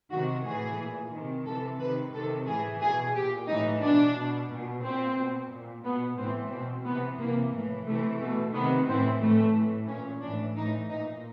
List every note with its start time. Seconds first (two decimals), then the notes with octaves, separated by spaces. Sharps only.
0.11 C3 D#3 F#4
0.45 A2 E3 G#4
0.78 A#2
1.12 C3 D#3
1.46 C3 E3 A4
1.80 C3 D#3 B4
2.13 C3 D#3 A4
2.47 A2 E3 G#4
2.81 B2 G#4
3.15 A#2 G4
3.48 A2 E3 D#4
3.82 B2 D4
4.16 B2
4.50 B2
4.83 A#2 C4
5.17 B2
5.50 A#2
5.84 B2 B3
6.18 A2 E3 C4
6.52 B2 C4
6.85 C3 E3 B3
7.20 C3 E3 A#3
7.53 A2 E3
7.87 C3 E3 A3
8.20 B2 A3
8.54 C3 D#3 B3
8.88 A2 E3 C4
9.21 A2 E3 A3
9.55 A2 E3
9.88 A#2 C#4
10.22 A2 E3 D4
10.57 A2 E3 D#4
10.90 A#2 D#4